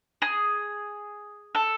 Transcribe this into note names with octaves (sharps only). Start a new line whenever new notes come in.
G#4
A4